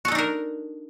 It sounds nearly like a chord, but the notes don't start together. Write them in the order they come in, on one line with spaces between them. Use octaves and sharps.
F#4 A4 D#4 D4 A#4